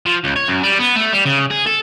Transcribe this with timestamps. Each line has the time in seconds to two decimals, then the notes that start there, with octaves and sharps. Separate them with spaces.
0.06 F3
0.24 C#2
0.36 C#5
0.48 F#2
0.63 G3
0.79 B3
0.96 A3
1.13 G3
1.25 C#3
1.50 G#4
1.66 A4